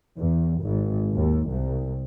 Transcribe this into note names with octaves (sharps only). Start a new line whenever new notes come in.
E2
G#1
D#2
C2